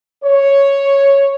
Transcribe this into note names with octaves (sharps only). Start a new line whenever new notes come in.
C#5